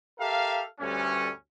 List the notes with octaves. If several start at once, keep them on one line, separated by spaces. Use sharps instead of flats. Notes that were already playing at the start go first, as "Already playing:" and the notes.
G4 A4 A#4 E5 F5
D2 G2 G3 A3 C#4